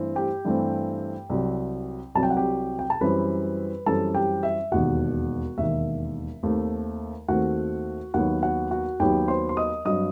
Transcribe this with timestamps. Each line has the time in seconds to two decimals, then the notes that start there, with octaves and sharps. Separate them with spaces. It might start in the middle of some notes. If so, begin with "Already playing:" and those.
Already playing: G2 E3 A3 C4
0.16 G4 G5
0.45 G2 E3 A3 C4
1.30 C2 C3 F#3
2.15 C2 C3 F#3 A5
2.23 G5
2.30 F#5
2.37 G4 G5
2.79 G5
2.90 A5
3.01 F#2 E3 G3 C4 B4 B5
3.86 F#2 E3 G3 C4 A4 A5
4.15 G4 G5
4.43 E5
4.72 E1 D#2 D#3 F#4 F#5
5.58 E1 D#2 D#3 E5
6.43 D#2 D#3 A3 C4
7.28 D#2 D#3 A3 C4 F#4 F#5
8.14 D#2 D#3 F#3 B3 F#4 F#5
8.42 F#4 F#5
8.71 F#4 F#5
9.00 D#2 D#3 F#3 B3 G4 G5
9.28 C5 C6
9.49 C6
9.57 D#5 D#6
9.85 G2 F#3 C4 D#5 D#6